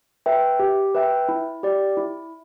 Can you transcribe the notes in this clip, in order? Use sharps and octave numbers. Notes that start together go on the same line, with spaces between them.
B4 E5 G5
G4
B4 E5 G5
E4
G4 D5
E4